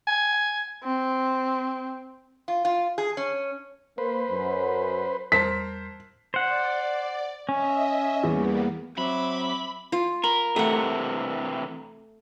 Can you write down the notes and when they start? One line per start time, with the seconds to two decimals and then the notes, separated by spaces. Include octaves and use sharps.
0.07 G#5
0.83 C4
2.48 F4
2.65 F4
2.98 G#4
3.17 C#4
3.98 A#3 B4 C5
4.30 F#2
5.32 E2 G3 A#4 C5 A5 B6
6.34 C5 D5 F#5
7.49 C#4 D#5 E5
8.23 E2 G3 A#3 B3
8.98 F#3 C4 E5 B5 D6
9.92 F4
10.24 A#4 B5
10.56 C3 E3 A3 F#5